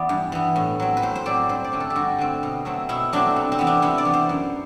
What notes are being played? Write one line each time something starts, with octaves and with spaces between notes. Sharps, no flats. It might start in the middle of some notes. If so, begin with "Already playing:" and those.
Already playing: E3 B3 D5
G2
E3 B3
A2
F#3 C4
B4
A2 C5
C5
F#3 C4 D5
G2 C5
D5
D3 A3 C4
A4
G4
G2 F#4
D3 A3 C4
B2
F#3 A3 C4
B2 E4
F#3 A3 C4 D4
C3
C4
E3 B3
D4
C3 E4
D5
E3 B3
C5
F#2